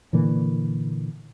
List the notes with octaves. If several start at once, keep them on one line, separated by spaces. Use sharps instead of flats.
A#2 D3 E3 A#3